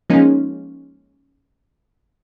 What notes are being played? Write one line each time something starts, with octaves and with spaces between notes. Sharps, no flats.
F3 G#3 A#3 C#4 D#4